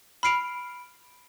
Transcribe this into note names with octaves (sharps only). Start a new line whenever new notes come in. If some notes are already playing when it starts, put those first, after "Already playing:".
B5 F6 C7 D7 F7